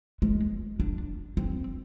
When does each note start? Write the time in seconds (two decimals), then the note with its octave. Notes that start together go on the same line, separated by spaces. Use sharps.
0.22 G#3
0.80 D4
1.37 C4